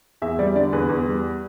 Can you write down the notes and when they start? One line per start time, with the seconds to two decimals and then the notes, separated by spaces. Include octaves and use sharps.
0.22 E2 E5
0.39 G3 D5
0.56 D3 D5
0.73 E2 B4
0.89 E2
1.06 G3